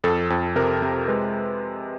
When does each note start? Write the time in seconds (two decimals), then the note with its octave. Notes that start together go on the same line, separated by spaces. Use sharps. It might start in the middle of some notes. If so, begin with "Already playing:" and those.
0.04 F2 A4
0.30 F2
0.56 C3 A#4
0.82 C3
1.08 G#3 B4